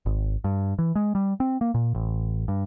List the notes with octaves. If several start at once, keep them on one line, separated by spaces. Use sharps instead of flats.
G#1
G2
E3
G#3
G3
C4
A#3
A#2
A1
G2